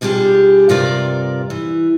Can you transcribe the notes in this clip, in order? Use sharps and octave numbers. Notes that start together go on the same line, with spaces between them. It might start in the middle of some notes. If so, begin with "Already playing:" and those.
B2 D3 G3 F4 G4 G#4
G2 C3 F4 A#4 D5
E3